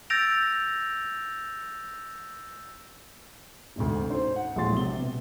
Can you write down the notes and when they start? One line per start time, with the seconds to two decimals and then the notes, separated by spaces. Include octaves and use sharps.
0.10 E6 G6 A6 A#6 D7 F7
3.76 D2 G#2 C3
4.09 C#4 D#4 C5
4.36 F#5
4.56 A#1 A2 F#3 G#3 C6 A6
4.74 C3 G7
4.99 B2